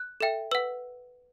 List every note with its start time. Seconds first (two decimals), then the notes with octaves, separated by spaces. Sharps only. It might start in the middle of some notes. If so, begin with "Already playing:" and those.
Already playing: F#6
0.21 A4 E5 G5
0.51 B4 F#5 E6